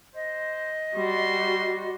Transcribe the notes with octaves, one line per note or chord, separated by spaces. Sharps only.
C5 D#5
G3 F#4 C6